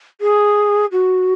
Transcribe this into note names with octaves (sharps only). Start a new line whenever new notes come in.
G#4
F#4